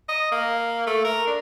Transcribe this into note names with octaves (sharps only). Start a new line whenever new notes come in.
D#5
A#3
A3
A#4
D4